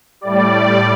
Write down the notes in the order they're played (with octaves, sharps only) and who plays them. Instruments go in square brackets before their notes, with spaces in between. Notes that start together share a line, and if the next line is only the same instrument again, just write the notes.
[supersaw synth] A2 G3 D5